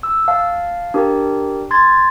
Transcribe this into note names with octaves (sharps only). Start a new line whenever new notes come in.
E6
F5 A5
D4 G4 A#4
C6 G#6 A6